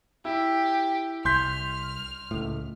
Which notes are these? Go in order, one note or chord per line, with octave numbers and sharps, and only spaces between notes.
E4 G4
C2 C6 F6 G6 B6
C#2 A2